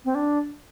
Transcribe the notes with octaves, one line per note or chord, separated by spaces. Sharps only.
C4
D4